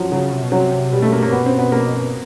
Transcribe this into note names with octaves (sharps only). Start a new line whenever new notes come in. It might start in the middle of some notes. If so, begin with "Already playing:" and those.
Already playing: F3 F#3
C#3 F#3
C3
B2
C3 F#3
B2 G3
A3
A#3
A#3
B3
C4
B3
A#3